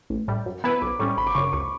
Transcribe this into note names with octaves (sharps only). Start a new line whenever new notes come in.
A1
A2 G3
F#2
E3 B3 E4 B4 B5
B1 D6
A2 G3 C#4 C#6
G1 B5
D6
F#2 C#3 C#6
D6
C#2 C#6